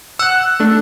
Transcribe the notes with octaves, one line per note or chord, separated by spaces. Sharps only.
F#5 E6 F#6
A3 D4